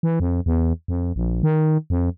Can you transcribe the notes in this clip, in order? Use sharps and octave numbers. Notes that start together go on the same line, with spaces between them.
E3
F2
E2
F2
A#1
D#3
F2